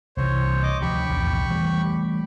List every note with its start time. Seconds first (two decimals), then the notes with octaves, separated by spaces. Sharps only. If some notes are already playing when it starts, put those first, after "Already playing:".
0.17 C2 C3 E3 C5 C#5
0.63 D#5 D6
0.81 D2 F3 G4 B5 C#6
1.09 B1 E2 A2
1.50 E3 G3 A3